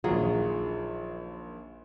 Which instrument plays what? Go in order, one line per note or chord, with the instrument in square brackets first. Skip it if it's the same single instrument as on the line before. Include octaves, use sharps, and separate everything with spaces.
[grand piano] A#1 D#2 [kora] F#3 G#4 [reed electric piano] F4